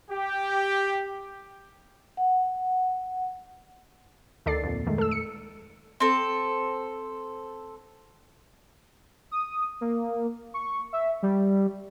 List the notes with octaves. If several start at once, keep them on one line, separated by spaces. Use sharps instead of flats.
G4
F#5
D2 D#3 A4 D5 A6 C7
F2 A#2
D#3 G#3 A3
A4 E6
C#7
C4 A4
D#6
A#3
C#6
E5
G3